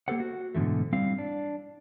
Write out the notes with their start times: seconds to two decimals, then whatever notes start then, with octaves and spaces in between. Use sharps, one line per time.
0.08 A#3 C4 G4 A4 C5 F#5
0.20 F#4
0.55 G#2 B2 D3 E3 A3
0.93 G3 C4 E4 F5
1.18 D4